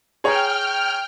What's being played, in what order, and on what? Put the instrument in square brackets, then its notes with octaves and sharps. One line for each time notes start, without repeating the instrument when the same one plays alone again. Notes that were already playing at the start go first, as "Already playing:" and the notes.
[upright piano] G#4 C#5 A#5 [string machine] G5 F6